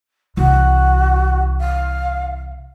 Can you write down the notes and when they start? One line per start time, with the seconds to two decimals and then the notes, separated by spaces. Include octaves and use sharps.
0.37 C2 E3 F#4
1.60 F5